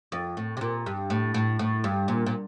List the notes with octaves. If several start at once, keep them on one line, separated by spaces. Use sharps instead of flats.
F2
A2
C3
A#2
G2
A2
A2
A2
G2
A#2
A#2